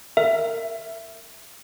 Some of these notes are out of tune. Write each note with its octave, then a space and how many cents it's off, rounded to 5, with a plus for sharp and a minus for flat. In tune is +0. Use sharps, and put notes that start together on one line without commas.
A#4 -20 E5 +10